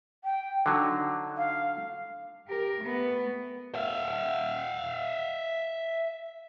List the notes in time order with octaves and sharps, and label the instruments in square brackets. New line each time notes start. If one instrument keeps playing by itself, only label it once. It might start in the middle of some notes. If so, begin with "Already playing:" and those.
[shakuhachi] G5
[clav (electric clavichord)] D3 F#3 [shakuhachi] D#4
[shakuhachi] F5
[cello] G4 A#4
A3 B3
[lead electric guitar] E5 F5